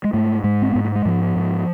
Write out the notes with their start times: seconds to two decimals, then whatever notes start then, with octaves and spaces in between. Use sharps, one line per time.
0.04 G#3
0.13 G#2 A3
0.44 G#2 G#3
0.62 C4
0.73 G#2 B3
0.84 A3
0.95 G#3
1.05 G#2 F3
1.36 G#2